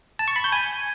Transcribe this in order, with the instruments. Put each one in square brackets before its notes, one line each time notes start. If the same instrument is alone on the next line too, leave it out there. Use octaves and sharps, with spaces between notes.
[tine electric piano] A5
C#6
B5
G6
G#5